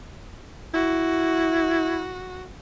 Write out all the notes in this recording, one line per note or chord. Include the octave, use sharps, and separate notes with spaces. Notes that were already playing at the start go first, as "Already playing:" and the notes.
E4 F#4